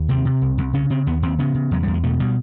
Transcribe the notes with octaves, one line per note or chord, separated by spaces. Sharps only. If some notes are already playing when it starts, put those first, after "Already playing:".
Already playing: D#2
C3 C4
C3
C2
C2
C#3 C#4
C#3 C4
D#2 B3
D#2 C4
C#3 B3
C#3
E2 F#3
E2 G3
G#3
B2 A3
B2 G3